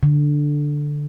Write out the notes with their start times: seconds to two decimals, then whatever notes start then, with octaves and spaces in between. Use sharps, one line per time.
0.03 D3